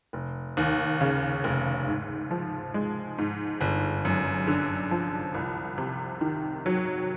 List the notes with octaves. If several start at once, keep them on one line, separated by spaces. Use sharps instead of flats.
F1
D#2
C#3
F1
G#2
F3
G#3
G#2
G1
F#2
D3
F3
C2
C3
D#3
F#3